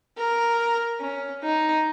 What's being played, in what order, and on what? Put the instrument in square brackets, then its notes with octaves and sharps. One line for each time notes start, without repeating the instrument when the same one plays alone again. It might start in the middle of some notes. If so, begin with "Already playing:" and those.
[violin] A#4
C#4
D#4